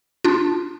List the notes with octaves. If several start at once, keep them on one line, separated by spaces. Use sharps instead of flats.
D4 F4